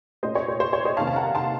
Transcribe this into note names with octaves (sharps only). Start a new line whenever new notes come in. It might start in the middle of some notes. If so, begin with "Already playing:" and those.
A#2 A3 C#4 C5 D#5
C#5
C5
C5
C#5
C5 D#5
C3 D#3 A#3 C#4 F5 A5
A5
F#5 A#5
A5 C6